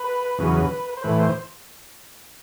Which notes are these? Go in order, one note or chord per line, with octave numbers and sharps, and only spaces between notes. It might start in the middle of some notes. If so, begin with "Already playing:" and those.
Already playing: B4
E2 C#3 F#3
C5
A2 E3 B4
C5